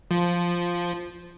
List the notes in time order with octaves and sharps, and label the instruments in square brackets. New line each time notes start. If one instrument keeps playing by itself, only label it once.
[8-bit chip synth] F3